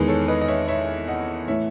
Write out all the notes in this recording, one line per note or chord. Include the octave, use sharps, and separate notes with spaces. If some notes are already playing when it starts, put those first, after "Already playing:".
Already playing: E2 D#3 G#3 G#4 B4
A4 C#5
B4 D#5
D#5
C#5 E5
C#5 E5
D#5 F#5
A2 E3 A3 C#5 E5